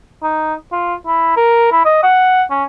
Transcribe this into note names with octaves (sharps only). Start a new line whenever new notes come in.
D#4
F4
E4
A#4
E4
D#5
F#5
C#4